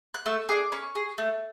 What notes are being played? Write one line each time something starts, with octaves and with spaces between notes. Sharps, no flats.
F#6
A3 E6
D4 G#4 D6
C#4 C#6
G#4
A3